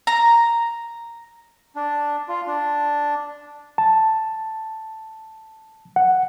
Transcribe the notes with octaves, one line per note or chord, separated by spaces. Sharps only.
A#5
D4
F4
D4
A5
F#5